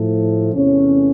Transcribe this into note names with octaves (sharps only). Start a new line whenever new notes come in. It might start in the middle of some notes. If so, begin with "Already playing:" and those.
Already playing: A2 F3 A3
E2 C3 E3 A3 C#4